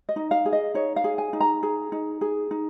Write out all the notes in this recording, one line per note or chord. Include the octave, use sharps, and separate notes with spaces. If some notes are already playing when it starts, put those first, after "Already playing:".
D#5
D#4
F5
G#4
D#5
D#4 C#5
F5
G#4
G#5
D#4
A#5
G#4
D#4
G#4
D#4